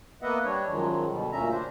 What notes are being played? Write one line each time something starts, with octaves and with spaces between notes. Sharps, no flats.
A#3 B3 B4 D#5 E5 F#5
G3 D4 C#5
F#2 D#3 F3 F#3 G#3
B2 D3 G3
D2 A#2 C#3 C#4 E5 A#5
D4 C5